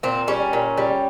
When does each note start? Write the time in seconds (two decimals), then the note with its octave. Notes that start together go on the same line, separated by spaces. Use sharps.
0.03 A#2 C4
0.28 G3 C#4
0.53 A#2
0.78 G3